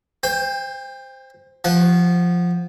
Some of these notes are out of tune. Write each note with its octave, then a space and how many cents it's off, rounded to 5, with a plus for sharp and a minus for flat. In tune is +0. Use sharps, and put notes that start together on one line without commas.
C5 +0 G5 +35
F3 +0 F#5 +0 A5 -35